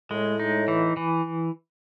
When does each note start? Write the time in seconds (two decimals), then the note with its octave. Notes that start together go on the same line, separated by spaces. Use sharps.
0.11 A2 G#3
0.39 D#4
0.68 E3
0.97 E3